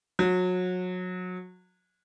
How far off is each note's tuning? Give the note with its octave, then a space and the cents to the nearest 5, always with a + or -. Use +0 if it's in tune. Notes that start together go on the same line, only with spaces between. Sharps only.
F#3 -25